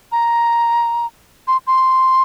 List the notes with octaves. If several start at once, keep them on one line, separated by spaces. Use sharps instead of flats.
A#5
C6
C6